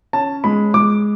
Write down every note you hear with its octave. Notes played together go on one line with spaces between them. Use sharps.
C#4 A5
G#3 B5
G#3 D6